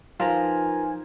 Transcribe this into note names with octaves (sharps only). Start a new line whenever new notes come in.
F3 D#4 F4 A#4 B4 G#5 A#5